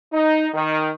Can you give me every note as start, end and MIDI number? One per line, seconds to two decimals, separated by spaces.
0.13 0.47 63
0.54 0.90 51